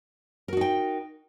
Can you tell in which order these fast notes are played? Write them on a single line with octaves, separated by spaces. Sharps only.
A#4 F#4 D#4 G5